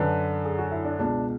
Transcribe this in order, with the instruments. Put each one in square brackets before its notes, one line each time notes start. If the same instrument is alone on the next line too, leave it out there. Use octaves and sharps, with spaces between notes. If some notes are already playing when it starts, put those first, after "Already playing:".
Already playing: [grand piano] F#2 D3 B4
G#4
F#4
E4
D4
C#2 B2 D4